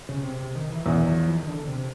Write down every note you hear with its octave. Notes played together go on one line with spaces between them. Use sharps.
C#3
C3
C3
D#3
E3
E2 D#3
F#3
F3
E3
D#3
D3
C3